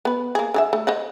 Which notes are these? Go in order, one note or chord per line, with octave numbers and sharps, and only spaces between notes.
B3 B4
A#3 G#4
D3 G#4 E5
A3
C5 D#5 F#5